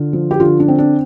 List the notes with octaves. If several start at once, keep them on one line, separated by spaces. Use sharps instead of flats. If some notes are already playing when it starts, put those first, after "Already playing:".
Already playing: D3 F4
F3
G4
D3 F4
D4
C4
D4